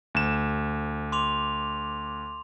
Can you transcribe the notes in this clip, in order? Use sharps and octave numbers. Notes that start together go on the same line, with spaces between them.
D2 E7
C6 D6 F7